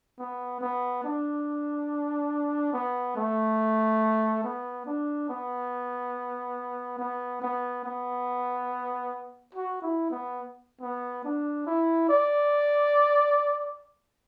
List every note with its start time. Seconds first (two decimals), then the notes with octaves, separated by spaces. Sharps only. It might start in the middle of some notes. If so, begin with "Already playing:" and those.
0.19 B3
0.61 B3
1.04 D4
2.73 B3
3.16 A3
4.44 B3
4.86 D4
5.29 B3
6.99 B3
7.42 B3
7.85 B3
9.55 F#4
9.82 E4
10.11 B3
10.82 B3
11.25 D4
11.67 E4
12.09 D5